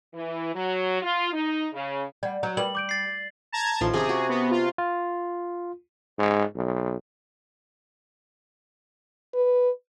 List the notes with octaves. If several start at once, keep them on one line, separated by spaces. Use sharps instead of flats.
E3
F#3
F4
D#4
C#3
G3 D5 F#5
F#3 A#5 G6
G3 A#4 B4 G5 F#7
D6 G6 D7
A6 C7
A5 A#5 G#6
A1 D#3 F3 C6
C3 C#4 G4 G#4
F#4
B3
F4
F4
G#2
B1
B4